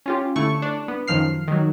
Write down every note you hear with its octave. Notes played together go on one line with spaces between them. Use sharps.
C#4 F4 G4
D3 A3 E4 C#6
D4
B3
F#2 D#3 F3 F6 C7
D#3 F#3